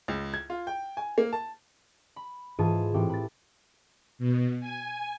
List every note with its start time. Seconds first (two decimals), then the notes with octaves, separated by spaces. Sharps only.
0.08 C#2
0.34 G#6
0.50 F4
0.67 G5
0.97 G#5
1.18 A#3
1.33 A5
2.16 B5
2.59 G#2 E3 F4 G#4 A5 D#7
2.94 A2 E3 C4 G4
3.09 B5 A6
4.19 B2
4.61 G#5